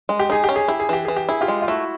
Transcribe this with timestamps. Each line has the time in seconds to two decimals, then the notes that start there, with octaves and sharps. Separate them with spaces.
0.09 G#3
0.19 G4
0.30 D#4 G#4
0.44 C#4 G4
0.56 G#4
0.68 E4 G4
0.80 G#4
0.89 E3 G4
1.05 E3 G#4
1.16 G4
1.29 E4 G#4
1.41 F4 G4
1.48 G#3
1.62 F4
1.68 A3 E4 F#4